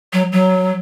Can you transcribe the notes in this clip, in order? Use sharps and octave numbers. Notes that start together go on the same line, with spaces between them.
F#3
F#3